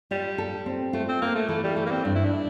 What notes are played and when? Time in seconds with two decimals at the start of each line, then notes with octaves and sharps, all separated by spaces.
0.11 G3 F4
0.38 A4
0.66 C4
0.93 A3 F4
1.08 C4
1.22 A#3 F4
1.35 A3
1.48 E3 A3
1.63 G3
1.76 E3 A3
1.86 A#3
1.91 C4
2.04 G2 D4
2.15 E4
2.25 D4